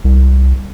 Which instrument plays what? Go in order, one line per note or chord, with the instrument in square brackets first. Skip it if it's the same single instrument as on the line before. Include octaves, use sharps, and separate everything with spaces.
[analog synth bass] C2